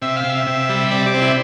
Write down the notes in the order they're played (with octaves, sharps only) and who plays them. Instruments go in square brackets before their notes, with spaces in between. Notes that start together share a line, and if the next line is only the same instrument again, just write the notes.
[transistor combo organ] C3 E5
F5
C3
E5
C3
G3
C3 D5
D5
C4
E4